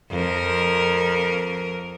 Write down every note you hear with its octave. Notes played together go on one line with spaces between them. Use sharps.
F2 A#4